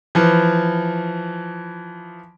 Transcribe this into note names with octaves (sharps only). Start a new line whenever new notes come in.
E3 F3